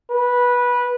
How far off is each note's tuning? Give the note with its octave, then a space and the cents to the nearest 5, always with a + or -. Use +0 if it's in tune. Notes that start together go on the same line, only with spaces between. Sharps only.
B4 -15